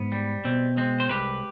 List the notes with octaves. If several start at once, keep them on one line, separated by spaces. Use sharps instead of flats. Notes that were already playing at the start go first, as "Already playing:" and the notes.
Already playing: G#2 B3
G3
B2 C4
G#3 C4
C5
C2 G4 B4